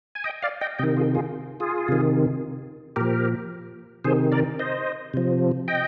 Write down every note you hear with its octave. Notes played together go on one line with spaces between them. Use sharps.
G#5
D#5 G5
D5 F5
D#5 G5
C3 D#3 D#5 G5
F4 G#4
F4 G#4
F4 G#4
C3 D#3
A#2 F3 G4 A#4
C3 D#3 G#4 C5
A#4 D5
C5 D#5
C3 F3
D#5 G5